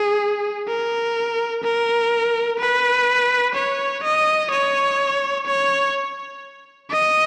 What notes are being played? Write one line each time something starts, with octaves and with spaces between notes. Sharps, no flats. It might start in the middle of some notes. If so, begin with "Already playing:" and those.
Already playing: G#4
A#4
A#4
B4
C#5
D#5
C#5
C#5
D#5